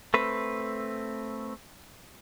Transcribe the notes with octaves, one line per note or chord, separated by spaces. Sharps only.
A3 C4 B4